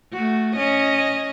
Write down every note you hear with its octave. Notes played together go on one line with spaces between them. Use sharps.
A3 F#4
C#4 D#5